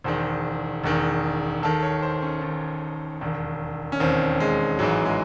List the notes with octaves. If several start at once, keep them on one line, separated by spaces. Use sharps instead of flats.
E1 E2 D#3 C5
E1 E2 D#3
D#2 D#3 A4
C#5
C5
C#4
D#2 D#3
E1 D#2 D#3
C#4
E1 D#2 D#3 C4
G#3
A1 G#2 E3 F#3
G#3